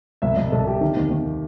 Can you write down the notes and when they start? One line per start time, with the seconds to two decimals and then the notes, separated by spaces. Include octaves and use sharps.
0.22 C2 E5
0.37 C2 D#5
0.52 C2 A4
0.66 C3 G4
0.81 D#3
0.96 D#2
1.11 D#2